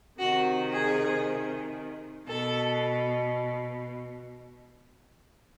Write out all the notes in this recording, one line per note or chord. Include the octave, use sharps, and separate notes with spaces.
C3 D#3 F#4
G#4
B2 A4